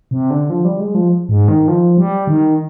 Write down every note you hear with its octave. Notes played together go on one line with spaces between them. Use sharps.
C3
D3
F3
G3
G#3
F3
G#2
D#3
F3
G3
D#3